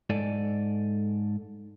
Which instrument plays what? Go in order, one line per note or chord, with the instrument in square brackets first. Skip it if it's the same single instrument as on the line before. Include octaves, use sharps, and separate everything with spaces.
[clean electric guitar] G#2 A4 D5 G#5